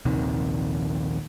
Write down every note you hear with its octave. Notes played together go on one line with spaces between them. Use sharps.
A#1 D#2 C3 D#3